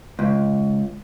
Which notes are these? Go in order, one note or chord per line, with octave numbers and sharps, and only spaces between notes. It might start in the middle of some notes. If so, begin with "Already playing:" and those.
C#2